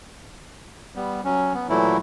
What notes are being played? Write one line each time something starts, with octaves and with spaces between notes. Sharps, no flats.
G3 B3
F#3 C#4
B3
A#2 E3 F#3 A3 E4